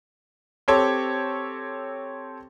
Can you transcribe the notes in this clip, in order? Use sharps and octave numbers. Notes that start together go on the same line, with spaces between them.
C4 G4 A4 C#5